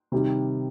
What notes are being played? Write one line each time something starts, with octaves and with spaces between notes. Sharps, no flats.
C3 D#3 G3